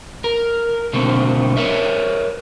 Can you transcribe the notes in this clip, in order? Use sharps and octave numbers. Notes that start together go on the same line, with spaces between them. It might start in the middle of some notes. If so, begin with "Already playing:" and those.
A#4
B2 D3 A3 A#3 C4
A#4 B4 C#5 E5